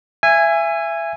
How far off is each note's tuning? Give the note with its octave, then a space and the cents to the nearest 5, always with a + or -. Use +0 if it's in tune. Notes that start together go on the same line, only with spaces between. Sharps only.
E5 +25 G#5 -10